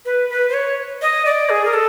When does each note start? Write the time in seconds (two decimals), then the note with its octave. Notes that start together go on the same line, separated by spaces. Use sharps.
0.05 B4
0.30 B4
0.49 C5
0.54 C#5
1.02 D#5
1.26 D5
1.50 G#4
1.65 A#4
1.74 A4